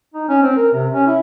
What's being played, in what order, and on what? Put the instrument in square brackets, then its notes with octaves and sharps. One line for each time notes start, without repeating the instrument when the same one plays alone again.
[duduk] D#4
C#4
C4
A#4
C3
C#4
E4